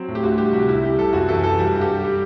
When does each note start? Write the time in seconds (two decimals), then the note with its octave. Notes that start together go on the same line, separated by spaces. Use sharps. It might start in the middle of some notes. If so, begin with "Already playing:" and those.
Already playing: F#3 C4
0.08 A2
0.15 G4
0.23 D2 F#4
0.38 G3 G4
0.53 C3 F#4
0.68 C2 E4
0.83 G3 G4
0.99 C3 A4
1.13 F#2 F#4
1.29 E3 A4
1.43 E3 A4
1.59 G3 F#4
1.74 G2
1.81 G4
1.89 G3
2.04 G3